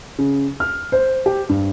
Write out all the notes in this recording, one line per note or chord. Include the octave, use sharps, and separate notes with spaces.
C#3
F6
C5
G4
G2